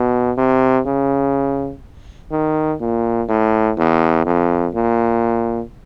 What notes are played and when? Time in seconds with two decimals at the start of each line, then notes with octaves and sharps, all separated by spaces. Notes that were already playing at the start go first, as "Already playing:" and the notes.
Already playing: B2
0.37 C3
0.86 C#3
2.31 D#3
2.80 A#2
3.28 A2
3.77 E2
4.25 F2
4.74 A#2